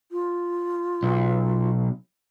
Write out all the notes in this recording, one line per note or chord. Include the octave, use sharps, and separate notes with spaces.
F4
B1